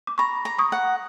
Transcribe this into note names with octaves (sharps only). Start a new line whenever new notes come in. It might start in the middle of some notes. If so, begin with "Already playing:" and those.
D6
A#5 B5 C#6
A#5
C#6 D#6
F#5